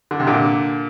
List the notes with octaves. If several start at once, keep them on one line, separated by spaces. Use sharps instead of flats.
D3
C3
A#2 D3